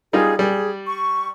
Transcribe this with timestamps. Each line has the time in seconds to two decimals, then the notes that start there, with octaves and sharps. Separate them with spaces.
0.13 G3 D#4 F4 G#4
0.39 G3 G#4
0.86 C#6